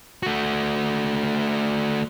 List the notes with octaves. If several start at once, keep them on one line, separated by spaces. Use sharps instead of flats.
A3 F#4